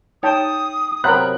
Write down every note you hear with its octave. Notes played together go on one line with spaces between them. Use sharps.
D#4 C#5 G5 A5 D#6
C3 F#3 F#4 A#4 B5 F#6